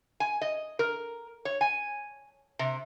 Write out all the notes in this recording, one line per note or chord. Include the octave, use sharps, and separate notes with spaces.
G#5
D#5
A#4
C#5
G#5
C3